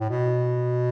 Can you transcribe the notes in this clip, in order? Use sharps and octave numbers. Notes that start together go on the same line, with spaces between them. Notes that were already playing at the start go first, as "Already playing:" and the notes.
A2
B2